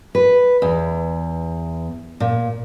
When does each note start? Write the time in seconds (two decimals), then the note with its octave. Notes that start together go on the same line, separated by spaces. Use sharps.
0.15 B4
0.62 E2
2.20 A#2